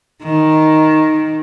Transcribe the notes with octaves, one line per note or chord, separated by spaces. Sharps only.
D#3